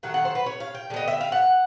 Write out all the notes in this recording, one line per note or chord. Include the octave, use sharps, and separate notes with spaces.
D#3 F#3 A3 F#5
F#5
C5
B4
C#5
F5
G5
D3 G3 B3 D#5
E5
F5
F#5